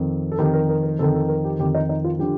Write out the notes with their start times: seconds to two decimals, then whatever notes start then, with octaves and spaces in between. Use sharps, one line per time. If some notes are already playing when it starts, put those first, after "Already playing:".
Already playing: F2 D#3
0.32 A4
0.39 F2 D#3 G4
0.53 A#4
0.69 A#4
0.83 A#4
0.99 F2 D#3 A4
1.14 A4
1.28 A#4
1.44 G4
1.59 F2 G4
1.63 D#3
1.75 D#4
1.89 D#4
2.04 F4
2.19 D3 F3 G4